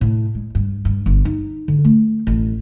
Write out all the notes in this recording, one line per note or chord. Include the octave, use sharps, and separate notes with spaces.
A2
G#3
G2
G2
G1
D#4
D3
A3
A1